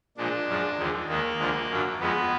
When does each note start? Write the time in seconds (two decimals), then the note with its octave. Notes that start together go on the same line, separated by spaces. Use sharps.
0.17 A#2 F3 G#3 D4
0.47 F#2 F3 G#3
0.78 D#2 D3 F3 G#3
1.08 D#2 D#3 G#3 A#3
1.39 D2 D3 F3 G#3
1.69 F#2 D3 F#3
2.00 F2 F3 G#3 B3